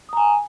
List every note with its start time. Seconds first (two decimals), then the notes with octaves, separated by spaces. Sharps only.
0.09 D#6
0.13 A#5
0.17 G#5